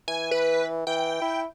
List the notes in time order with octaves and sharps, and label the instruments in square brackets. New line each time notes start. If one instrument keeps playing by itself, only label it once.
[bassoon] E3 [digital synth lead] G#5
[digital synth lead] B4
[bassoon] E3 [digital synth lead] G5
[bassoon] E4